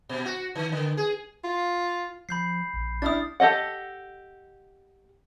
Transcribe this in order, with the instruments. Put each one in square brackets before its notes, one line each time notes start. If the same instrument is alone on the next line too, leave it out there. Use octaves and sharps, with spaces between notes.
[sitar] B2
F#4
D#3
D3
G#4
[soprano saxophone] F4
[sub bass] F3 [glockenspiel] B5 G6 C7
[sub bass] A#1
[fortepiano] D4 E4 F6 [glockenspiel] D#6 A6
[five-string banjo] G4 A4 D#5 F#5